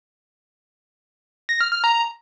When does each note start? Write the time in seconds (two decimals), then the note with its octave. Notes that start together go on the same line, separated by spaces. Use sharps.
1.49 A#6
1.61 F6
1.72 F6
1.84 A#5